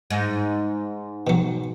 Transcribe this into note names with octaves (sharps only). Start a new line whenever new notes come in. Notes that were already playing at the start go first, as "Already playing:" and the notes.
G#2
B2 F#3